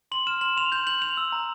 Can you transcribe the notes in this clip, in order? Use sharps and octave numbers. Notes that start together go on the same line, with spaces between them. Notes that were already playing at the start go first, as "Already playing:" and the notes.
C6 F#7
F6 E7
C6 F#7
C6 F7
G6 F#7
G6 F#7
G6 F7
E6
A#5